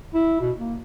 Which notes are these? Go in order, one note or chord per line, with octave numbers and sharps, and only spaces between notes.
E4
B2
A#3